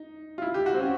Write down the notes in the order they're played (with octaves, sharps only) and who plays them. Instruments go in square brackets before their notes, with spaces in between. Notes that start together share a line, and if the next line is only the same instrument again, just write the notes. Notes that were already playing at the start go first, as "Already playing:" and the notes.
Already playing: [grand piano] D#4
F4
E4
G4
F#4
C4
C#4